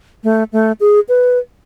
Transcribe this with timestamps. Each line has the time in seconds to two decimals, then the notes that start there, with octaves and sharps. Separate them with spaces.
0.24 A3
0.52 A3
0.80 G#4
1.09 B4